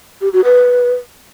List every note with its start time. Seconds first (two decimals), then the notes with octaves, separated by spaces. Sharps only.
0.21 G4
0.33 F#4
0.45 B4